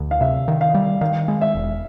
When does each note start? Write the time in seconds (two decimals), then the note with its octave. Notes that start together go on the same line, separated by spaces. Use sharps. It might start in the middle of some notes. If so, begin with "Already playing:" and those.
Already playing: D2
0.11 F5
0.21 C3 E5
0.48 D#3
0.61 F5
0.74 G3
1.01 D#3 F5
1.28 G#3
1.41 E5
1.55 E1